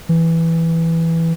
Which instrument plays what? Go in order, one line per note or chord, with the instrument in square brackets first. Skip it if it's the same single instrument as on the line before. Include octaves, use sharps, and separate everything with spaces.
[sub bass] E3